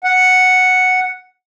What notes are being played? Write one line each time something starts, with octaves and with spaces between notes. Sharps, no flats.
F#5